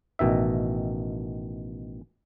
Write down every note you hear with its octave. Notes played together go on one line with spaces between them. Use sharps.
A1 B2 D#3 E5